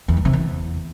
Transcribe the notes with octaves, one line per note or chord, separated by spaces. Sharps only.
E2
G2
C3
E2